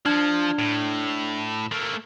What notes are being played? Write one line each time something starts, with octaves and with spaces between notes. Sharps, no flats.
F3 D4 F6 G#6
A2
A3 A#3